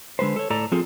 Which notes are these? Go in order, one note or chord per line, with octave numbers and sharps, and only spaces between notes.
D3 G#3 B4 C5
A4 C#5
A2 A4 D5 A#5
F3 C4 F4 G#4 A4